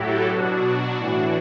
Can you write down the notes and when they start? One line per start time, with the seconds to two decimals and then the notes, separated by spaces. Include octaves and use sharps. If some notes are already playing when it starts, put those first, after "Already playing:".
Already playing: A2 F#3 E4 F#4 G4 A4
0.27 B2 F#3 D4 F#4
0.97 A2 E3